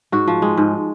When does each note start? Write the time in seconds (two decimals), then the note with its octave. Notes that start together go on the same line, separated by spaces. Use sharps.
0.12 G#2 F#4
0.28 F3
0.42 G#3
0.57 G#2